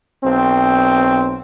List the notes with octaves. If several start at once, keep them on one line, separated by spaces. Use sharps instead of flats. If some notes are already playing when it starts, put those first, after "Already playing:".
B1 C4